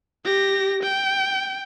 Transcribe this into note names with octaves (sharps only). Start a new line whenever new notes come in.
G4 A#6
G5